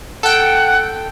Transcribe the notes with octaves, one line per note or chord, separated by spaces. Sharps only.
A4 F#5 G5